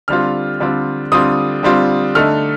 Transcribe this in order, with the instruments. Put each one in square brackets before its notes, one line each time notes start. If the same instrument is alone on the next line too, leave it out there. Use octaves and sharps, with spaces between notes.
[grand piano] D3 G3 C4 F4 F6
D3 G3 C4 F4
D3 G3 C4 F4 D#6
D3 G3 C4 F4
D3 A3 D#4 F6